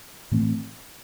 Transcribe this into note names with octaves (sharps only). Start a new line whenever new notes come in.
A2 E3 A3 C4